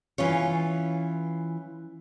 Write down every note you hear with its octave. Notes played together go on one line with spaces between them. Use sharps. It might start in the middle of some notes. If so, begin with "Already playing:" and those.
E3 C#4 F4 C#5